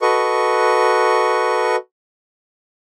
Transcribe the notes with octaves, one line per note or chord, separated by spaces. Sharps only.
F#4 A4 B4 D#5 C#6